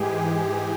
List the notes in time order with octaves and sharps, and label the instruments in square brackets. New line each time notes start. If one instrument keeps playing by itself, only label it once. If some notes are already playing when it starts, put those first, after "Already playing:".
Already playing: [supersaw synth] G#2 E3 G#3 G4 G#4
G#4